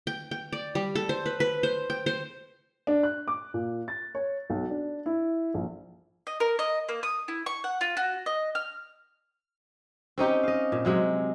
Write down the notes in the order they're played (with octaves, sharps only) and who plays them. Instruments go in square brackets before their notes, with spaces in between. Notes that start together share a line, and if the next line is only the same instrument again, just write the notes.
[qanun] G5
G5
D5
G3
A4
C5
B4
B4
C5
G5
C5
[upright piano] D4
F#6
D6
A#2
A6
C#5
B1
D4
E4
A#1
[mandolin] D#5
A#4
D#5
A#3
D#6
E4
C#6
F#5
F4
F#4
D#5
F6
[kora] C4 C#4 D#4 G4
D#5 F5
A#2
C3 F#3 G#3